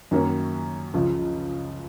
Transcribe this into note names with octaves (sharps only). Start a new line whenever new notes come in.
F#2 D#3 F#3 A#3 C#4
C#2 C#3 F3